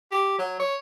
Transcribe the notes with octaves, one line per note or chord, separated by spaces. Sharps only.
G4
F#3
C#5